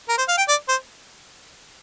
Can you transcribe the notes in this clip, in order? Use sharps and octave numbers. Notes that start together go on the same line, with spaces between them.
A#4
C5
F5
G5
D5
C5